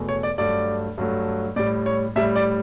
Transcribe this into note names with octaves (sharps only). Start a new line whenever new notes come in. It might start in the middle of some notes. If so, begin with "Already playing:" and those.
Already playing: E2 B2 A3
C#5
D5
G2 F#3 A3 D5
G2 F#3 A3
A2 G3 D5
C#5
A2 G3 E5
D5